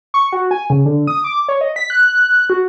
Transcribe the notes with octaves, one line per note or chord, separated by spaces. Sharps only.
C#6
F#4
G#5
C#3
D3
D#6
D6
C#5
D#5
B6
F#6
F#4